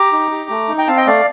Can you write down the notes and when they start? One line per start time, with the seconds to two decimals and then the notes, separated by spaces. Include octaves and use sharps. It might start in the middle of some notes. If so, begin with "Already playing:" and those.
Already playing: G4 A#5 D6
0.12 D#4
0.31 G4
0.50 A3
0.69 D#4
0.78 G5 A#5
0.87 C4 F5 A5
0.97 D#5 G5
1.07 A3 D5 F5